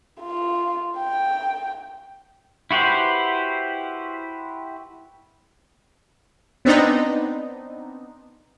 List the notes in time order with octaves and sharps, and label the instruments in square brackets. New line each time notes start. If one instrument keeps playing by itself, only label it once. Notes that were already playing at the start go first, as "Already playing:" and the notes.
[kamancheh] F4
G5
[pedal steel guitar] E4 F#4 G4 B4 C5
[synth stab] B3 C4 D4 D#4